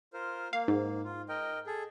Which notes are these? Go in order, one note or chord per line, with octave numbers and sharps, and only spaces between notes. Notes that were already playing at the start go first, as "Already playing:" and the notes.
F4 A#4 C5
A#3 F5
G#2
F4
A#4 D#5 G5
G#4 A4